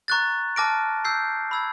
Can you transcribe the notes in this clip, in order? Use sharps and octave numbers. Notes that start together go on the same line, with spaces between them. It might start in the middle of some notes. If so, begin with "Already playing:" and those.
A#5 C#6 F#6 A6
A5 D6 F6 A#6 D7
E6 G6 C7
B5 E6 G#6